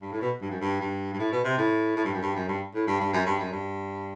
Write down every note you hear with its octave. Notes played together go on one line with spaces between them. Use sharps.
G2
A2
B2
G2
F#2
G2
G2
G2
A2
B2
C3
A2
A2
G2
F#2
G2
F#2
G2
A2
G2
G2
F#2
G2
F#2
G2